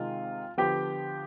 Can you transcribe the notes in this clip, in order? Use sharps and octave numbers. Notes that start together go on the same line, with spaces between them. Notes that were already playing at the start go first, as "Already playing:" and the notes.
Already playing: C3 D#3 G#3 F4
D3 F3 B3 G4 G5